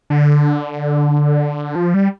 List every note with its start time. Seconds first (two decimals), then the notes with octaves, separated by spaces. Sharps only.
0.10 D3
1.75 F3
1.94 G3